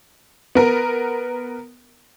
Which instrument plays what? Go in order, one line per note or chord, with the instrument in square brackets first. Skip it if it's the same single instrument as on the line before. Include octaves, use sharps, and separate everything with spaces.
[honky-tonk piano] B3 A#4